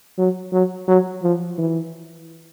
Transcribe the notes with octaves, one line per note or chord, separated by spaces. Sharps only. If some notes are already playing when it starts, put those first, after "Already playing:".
F#3
F#3
F#3
F3
E3